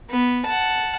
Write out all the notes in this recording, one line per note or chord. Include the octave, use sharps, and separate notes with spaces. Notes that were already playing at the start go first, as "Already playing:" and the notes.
B3
F#5 A5